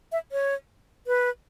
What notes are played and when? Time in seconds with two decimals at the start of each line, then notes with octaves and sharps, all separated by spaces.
0.12 E5
0.32 C#5
1.07 B4